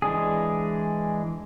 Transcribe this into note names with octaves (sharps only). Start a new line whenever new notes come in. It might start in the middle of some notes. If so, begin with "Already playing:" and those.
E3 G#3 D4 G#4